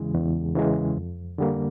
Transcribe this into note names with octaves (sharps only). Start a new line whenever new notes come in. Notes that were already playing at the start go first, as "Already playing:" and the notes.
Already playing: E2 C#3 E3 G#3
E2
C#3 E3 G#3
F2
D3 G3 A#3